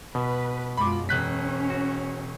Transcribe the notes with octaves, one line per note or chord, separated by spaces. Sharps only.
B2 B4
F#2 G#3 F4 B5 D6
E1 C#4 F#6 B6
F#4